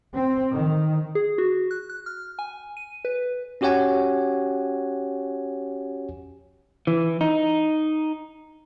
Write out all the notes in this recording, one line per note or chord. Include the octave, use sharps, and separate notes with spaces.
C4
D#3
G#4
F#4
F#6
F#6
F6
G#5
D#7
B4
C#4 F#4 G4 C#5 F#5 G#5
E3
D#4